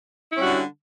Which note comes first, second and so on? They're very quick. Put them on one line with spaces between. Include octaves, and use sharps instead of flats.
E4 C#4 G3 F#4 D3